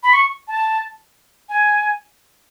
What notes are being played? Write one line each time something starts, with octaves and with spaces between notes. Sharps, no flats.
B5
C#6
A5
G#5